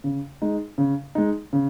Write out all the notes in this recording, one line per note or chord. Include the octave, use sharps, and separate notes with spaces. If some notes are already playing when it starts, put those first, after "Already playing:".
C#3
G#3 D#4
C#3
G#3 D#4
C#3